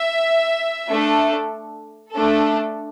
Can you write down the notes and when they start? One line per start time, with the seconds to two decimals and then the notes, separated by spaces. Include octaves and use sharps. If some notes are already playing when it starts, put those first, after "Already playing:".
Already playing: E5
0.89 A3 D4 A4
2.12 A3 D4 A4